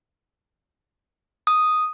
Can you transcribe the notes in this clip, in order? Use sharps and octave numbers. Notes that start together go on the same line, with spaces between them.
D#6